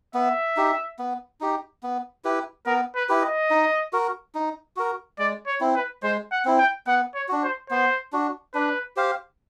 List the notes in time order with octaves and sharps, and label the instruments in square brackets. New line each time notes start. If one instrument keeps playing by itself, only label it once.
[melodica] B3 [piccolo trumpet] E5
[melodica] D#4 G4
B3
D#4 G4
B3
E4 G4 B4
[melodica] B3 [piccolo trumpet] A#4
[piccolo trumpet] B4
[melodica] E4 G4 B4
[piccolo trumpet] D#5
[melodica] D#4
F#4 A#4
D#4
F#4 A#4
[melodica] G#3 [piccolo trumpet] D5
[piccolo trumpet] C#5
[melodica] C4 E4
[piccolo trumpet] B4
[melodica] G#3 [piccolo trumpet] C5
[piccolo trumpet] F#5
[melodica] C4 E4
[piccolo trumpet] G5
[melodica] B3 [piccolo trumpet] F#5
[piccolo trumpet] C#5
[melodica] D4 F#4
[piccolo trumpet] C5
[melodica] B3 [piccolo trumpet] C5
[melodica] D4 F#4
[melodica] D4 [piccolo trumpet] B4
[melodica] G4 C5 F5